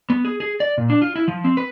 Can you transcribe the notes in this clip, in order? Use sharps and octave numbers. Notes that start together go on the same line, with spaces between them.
B3
G#4
G#4
D5
A#2
D4
F4
E4
F3
C4
B4